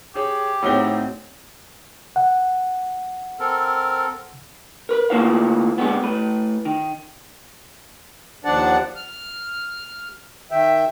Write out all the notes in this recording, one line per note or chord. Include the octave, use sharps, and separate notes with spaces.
G4 G#4 C#5
A2 F#3 C4 D#4 G#4 G7
F#5
C4 A4 A#4
A#4 B4
D2 A#3 E4 F4 B4 F5
A#2 D3 G3 G#3 B3
A2 B4
D#3
D#2 F3 D4 D5 F#5 A5
F6
D#3 E5 G5